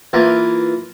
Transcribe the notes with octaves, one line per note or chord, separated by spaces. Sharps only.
E3 A#3 F4